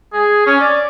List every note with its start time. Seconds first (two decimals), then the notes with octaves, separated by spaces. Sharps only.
0.13 G#4
0.46 C#4
0.61 D5